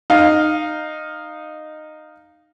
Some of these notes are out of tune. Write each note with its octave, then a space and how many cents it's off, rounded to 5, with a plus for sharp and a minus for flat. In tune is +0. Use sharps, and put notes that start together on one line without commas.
D#4 -15 F5 +0